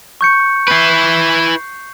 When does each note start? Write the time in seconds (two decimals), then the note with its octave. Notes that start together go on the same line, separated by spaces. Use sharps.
0.21 C#6 G6 C#7
0.68 E4 B4 G6 C7